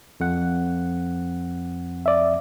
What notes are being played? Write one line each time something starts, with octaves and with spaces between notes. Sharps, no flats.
F2 F#5
D5 E5